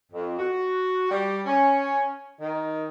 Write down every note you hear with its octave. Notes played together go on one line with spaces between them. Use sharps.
F2
F#4
G3
C#4
D#3